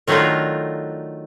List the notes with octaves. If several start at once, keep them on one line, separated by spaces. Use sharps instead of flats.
D#3 F#3 A3 D4 D#4 F4